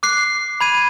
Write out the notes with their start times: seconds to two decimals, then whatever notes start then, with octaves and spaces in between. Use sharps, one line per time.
0.03 D6 F#6 C7
0.61 B5 G#6 D#7